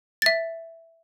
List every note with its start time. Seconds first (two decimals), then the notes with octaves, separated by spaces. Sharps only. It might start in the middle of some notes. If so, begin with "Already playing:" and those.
0.22 E5 A6